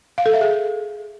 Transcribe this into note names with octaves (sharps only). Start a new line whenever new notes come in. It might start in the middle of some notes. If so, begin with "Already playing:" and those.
F5
A4
E5
G#4